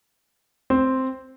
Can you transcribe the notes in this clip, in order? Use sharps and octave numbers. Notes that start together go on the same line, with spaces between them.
C4